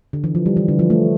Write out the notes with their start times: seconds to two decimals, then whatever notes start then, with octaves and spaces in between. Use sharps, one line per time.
0.13 D3
0.24 E3
0.35 F3
0.46 G3
0.57 E3
0.68 D3
0.79 F3
0.90 A3